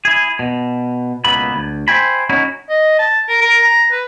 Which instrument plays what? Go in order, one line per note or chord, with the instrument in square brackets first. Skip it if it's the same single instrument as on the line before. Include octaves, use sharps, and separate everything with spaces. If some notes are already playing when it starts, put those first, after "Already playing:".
[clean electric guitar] E4 G#4
B2
C#2 B2 A#3 B3 E5 B5
D2
C5 C#5 E5 G5 G#5 B5
C#4 D#4 E4 F#4
[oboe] D#5
A5
A#4
A#4
A#5
B4